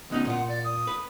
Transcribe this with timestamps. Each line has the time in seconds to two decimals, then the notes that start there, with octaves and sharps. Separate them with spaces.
0.10 D2 B3 C#4 D#4
0.27 A#2 F4 F#5
0.48 D5
0.64 D#6
0.87 B4